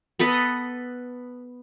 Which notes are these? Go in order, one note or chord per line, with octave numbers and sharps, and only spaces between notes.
B3 A4 B4 D#5